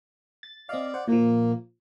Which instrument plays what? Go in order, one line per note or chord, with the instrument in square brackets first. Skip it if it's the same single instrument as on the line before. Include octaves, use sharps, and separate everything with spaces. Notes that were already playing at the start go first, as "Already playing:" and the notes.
[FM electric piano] A6
[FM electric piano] C4 D#5 F5 [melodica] D5
[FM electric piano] C5 F#5
[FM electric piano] A#2 F3 [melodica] A#3